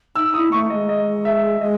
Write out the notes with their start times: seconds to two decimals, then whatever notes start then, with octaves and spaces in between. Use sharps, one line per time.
0.15 D#4 E6
0.34 E4 D#6
0.52 A3 C#6
0.70 G#3 D#5
0.89 D#5
1.25 E5
1.61 G#3 D#5